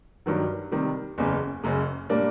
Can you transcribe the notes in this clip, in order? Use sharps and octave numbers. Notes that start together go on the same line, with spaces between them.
G2 D#3 F#3
C3 D#3 G3
F#1 E2 C#3
F#1 F#2 C#3
A#2 G3 A#3 D4